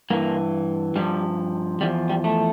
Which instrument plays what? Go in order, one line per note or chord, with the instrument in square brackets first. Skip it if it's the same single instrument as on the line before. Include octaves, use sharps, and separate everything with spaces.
[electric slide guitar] G2 E3 A#3
G2 F3 G3
E2 D3 F3 G3
G3
A3